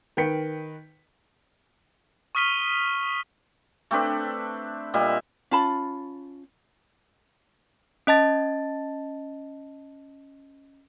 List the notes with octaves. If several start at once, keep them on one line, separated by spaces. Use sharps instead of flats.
D#3 B4 G5 B6 C#7
C#6 D#6 F6 B6 D#7 G7
A3 C4 D4 B4
A#2 G3 D#5 E5
C#4 F4 A5 B5
C#4 D#5 A5 A6